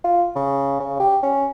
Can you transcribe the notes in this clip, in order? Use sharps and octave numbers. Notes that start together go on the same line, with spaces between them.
F4
C#3
C#3
G4
C#4